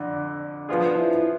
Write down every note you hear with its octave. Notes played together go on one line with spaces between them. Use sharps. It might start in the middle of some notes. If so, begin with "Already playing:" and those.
Already playing: F2 D3 D4
F3 B3 F4 G#4
E4